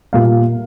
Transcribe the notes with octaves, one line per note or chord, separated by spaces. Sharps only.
A#2 G3 A#3 F5